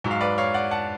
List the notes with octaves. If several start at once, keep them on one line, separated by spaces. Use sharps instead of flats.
G#2 F#3
F5
B4 D5
C#5 F5
D5 F#5
F#5 A5